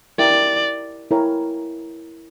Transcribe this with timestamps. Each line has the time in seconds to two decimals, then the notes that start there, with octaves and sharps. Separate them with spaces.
0.18 E4 G4 A#4 D5 E5 G5
1.11 E4 A#4 C#5 G5 A#5